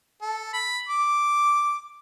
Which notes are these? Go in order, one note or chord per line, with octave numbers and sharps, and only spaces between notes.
A4
B5
D6